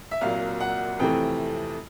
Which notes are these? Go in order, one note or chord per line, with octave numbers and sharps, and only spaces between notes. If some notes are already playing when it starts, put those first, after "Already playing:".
E5
C2 A#2 F#3 A#3 F5
F#5
F2 C3 E3 A3 G5